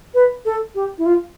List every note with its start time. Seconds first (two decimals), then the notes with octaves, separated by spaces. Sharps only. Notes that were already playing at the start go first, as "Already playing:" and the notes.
0.14 B4
0.45 A4
0.75 G4
0.98 E4
1.06 F4